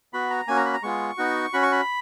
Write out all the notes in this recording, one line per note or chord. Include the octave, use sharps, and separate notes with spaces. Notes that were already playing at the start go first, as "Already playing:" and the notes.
B3 F#4 B5
A#5
A#3 C#4 F#4 G#5
A#5
B5
A#5
G#3 B3 F4 G#4 C#6
B3 D#4 F#4
C#4 F#4 B5
C#6
B5